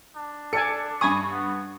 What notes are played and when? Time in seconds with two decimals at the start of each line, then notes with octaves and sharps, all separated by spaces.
0.16 D4
0.53 A4 D5 G#5 C#7
1.01 G2 G#5 B5 C#6 D#6
1.32 B3